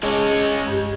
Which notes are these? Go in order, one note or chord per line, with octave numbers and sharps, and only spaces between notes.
G#3 C#4 A5 D6
G2 G4